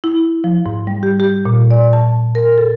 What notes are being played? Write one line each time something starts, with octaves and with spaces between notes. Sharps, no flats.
E4
F3
G#2
G3
G4
G4
A#2
D5
A5
A#4
A4